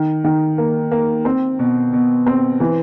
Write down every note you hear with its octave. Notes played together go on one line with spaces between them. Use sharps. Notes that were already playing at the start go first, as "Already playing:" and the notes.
Already playing: D#3
D#3
A#3
A#3
C4
B2
B2
C4
E3